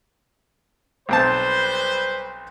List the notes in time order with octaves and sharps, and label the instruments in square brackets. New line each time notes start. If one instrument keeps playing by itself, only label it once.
[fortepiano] B1 C4 A5 [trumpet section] G3 B4 C5